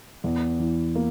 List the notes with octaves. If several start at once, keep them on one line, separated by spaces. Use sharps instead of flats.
E2
E3
A#3